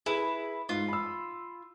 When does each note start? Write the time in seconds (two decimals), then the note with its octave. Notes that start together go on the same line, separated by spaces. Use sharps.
0.06 E4 G#4 B4 E7
0.69 G#2 F4
0.89 B5 E6